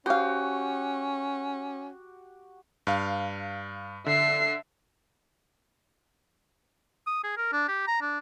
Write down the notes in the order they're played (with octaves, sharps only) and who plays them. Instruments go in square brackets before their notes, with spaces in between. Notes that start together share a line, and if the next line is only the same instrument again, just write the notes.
[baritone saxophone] C#4 [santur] F#4 G4 [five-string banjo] C5 F5
[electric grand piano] G2 F5
[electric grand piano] D3 [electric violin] E5 C7
[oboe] D#6
G#4
A#4
D4
G4
A#5
D4